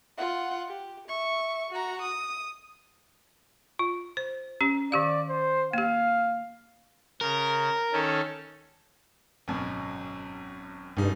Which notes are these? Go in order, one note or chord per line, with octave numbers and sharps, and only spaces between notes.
F4 F#5
G4
E5 C#6
F#4 A#5
D#6
F4
C5
C#4 G4
D#3 G4 D5 F5
C5
A#3 G4 F5
C#3 A#4
D#3 C#4 A4
G#1 F#2 B2
F1 G2 D#4